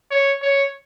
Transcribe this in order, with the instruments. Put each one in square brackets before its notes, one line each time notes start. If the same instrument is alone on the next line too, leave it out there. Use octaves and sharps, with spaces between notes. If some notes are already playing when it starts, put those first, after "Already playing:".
[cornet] C#5
C#5